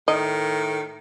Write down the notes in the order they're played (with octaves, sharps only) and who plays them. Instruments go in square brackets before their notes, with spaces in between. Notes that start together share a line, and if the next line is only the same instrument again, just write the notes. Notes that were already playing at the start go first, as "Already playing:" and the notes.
[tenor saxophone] A2 [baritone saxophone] D#3 [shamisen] D#5